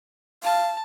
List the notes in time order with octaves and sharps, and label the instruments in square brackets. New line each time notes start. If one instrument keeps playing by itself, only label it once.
[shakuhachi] F5 [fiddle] A5